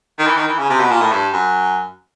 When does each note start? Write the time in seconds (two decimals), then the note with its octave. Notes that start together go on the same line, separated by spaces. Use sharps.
0.19 D#3
0.27 E3
0.37 D#3
0.48 E3
0.59 C#3
0.70 C3
0.80 B2
0.91 A#2
1.02 A2
1.12 G2
1.33 F#2